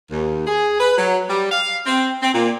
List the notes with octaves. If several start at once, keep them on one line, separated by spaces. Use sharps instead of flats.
D#2
G#4
B4
F#3
G3
F5
C4
C4
A#2